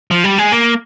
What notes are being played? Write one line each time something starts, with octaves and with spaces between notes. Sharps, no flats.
F3
G3
G#3
A#3